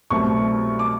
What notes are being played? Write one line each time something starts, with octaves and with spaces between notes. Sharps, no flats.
C2 B2 F#3 A3 C4 C#6
D6